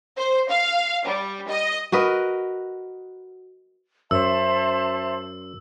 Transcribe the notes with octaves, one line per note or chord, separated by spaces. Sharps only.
C5
F5
G3
D#5
F#4 A#4 B4 D#5
F#2 C5 E5 A5 E6